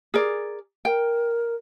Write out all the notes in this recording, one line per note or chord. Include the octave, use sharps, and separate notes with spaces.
G#4 A#4 D5
A#4 G5